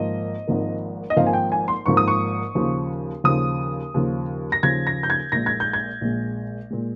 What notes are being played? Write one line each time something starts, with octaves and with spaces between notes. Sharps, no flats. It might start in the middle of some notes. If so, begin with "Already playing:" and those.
Already playing: G#1 G#2 F3 A#3 D#5
G#1 G#2 F3 A#3
D#5
G#1 G#2 F3 A#3 F5
G#5
G5
G#5
C6
G#1 G#2 F3 A#3 C#6
D#6
C#6
D#2 C#3 F3
D#2 C#3 F3 D#6
D#2 C#3 F3
A#6
D#2 C#3 F3 G#6
A#6
G6
G#6
A#1 A#2 G#3 A#6
G#6
G6
G#6
A#1 A#2 G#3
A#2 G#3